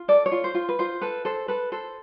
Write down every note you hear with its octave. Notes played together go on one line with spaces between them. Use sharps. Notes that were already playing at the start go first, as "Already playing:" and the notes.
Already playing: F4
A4 D5
C#5
F4
C5
F4
B4
F4 C5
A4 B4
A4 C5
A4 B4
A4 C5